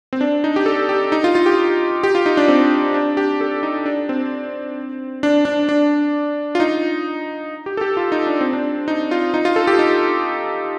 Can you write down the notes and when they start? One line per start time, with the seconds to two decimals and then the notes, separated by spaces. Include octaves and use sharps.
0.13 C4
0.21 D4
0.44 D#4
0.56 G4
0.66 A4
0.89 G4
1.12 D#4
1.24 F4
1.35 F4
1.46 G4
2.04 G4
2.15 F4
2.26 D#4
2.37 D4
2.48 C4
2.94 D4
3.17 G4
3.41 A4
3.63 D#4
3.86 D4
4.09 C4
5.23 D4
5.45 D4
5.69 D4
6.55 F4
6.60 D#4
7.66 G4
7.77 A4
7.81 G4
7.97 F4
8.12 D#4
8.27 D4
8.41 C4
8.53 D4
8.88 D#4
9.11 F4
9.34 D#4
9.45 F4
9.56 A4
9.67 G4
9.79 D#4